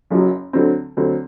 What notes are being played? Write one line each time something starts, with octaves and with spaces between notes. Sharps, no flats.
F#1 F#2 F#3
D2 D3 F#3 C4
D2 D3 F#3 C4